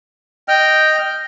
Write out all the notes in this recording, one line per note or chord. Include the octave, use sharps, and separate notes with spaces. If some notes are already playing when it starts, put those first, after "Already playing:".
D#5 G5 F6